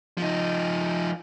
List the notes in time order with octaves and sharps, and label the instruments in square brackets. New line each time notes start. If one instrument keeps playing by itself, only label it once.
[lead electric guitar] F3 D#4